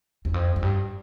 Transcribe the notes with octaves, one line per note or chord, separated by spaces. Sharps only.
E2
F2
F#2
G2